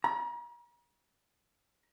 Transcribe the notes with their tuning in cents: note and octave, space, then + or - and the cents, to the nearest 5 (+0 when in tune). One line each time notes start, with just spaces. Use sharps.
A#5 +40